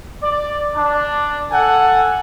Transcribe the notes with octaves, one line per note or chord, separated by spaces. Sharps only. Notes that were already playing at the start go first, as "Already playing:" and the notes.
D5
D4
A4 F#5 G#5